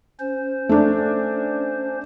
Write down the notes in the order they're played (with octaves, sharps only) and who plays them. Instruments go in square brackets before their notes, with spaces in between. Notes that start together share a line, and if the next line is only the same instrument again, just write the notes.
[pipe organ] C#4 C5
[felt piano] A3 D4